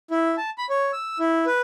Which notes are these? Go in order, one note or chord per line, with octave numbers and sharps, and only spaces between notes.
E4
A5
B5
C#5
E6
E4
B4